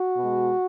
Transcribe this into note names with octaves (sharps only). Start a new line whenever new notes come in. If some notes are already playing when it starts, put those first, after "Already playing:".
Already playing: F#4
B2 G#3